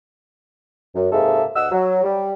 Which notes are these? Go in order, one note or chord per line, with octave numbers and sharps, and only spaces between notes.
F#2
G#2 C3 G#3 A#3 A4 E5
D2 D#5 F#5 E6
F#3
G3